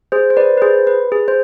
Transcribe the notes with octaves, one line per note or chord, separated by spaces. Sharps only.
G#4 C5
C5
B4 D5
B4
G#4 C5
B4
G#4
C5